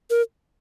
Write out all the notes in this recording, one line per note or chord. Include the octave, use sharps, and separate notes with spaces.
A#4